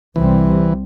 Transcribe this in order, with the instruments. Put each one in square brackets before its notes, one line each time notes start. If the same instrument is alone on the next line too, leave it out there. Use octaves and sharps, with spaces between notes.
[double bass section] C2 C3 G3 C4 [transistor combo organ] E3